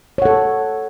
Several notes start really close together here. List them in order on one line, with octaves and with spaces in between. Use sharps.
C#5 F#5 A4